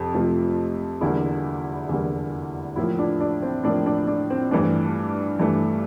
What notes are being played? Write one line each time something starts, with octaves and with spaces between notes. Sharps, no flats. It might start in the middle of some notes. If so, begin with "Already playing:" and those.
Already playing: F2 C3
F2 C3 F3 A3
E2 D3 G3 A#3 E4
E2 D3 G3 A#3
A2 F3 A#3 E4
D4
D4
C4
A2 F3 A#3 D4
D4
D4
C4
G2 E3 A3 D4
G2 E3 A3